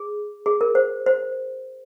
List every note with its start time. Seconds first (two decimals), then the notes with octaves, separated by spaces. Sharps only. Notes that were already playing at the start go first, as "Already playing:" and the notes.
Already playing: G#4
0.46 G#4
0.61 A#4
0.75 C5
1.06 C5